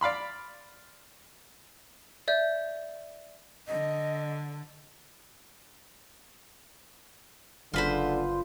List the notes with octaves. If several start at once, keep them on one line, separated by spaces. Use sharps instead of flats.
D5 F5 B5 C6
D5 E5 G6
D3 D#5
F#1 A#2 D3 F3 F4 G#4 B4 C5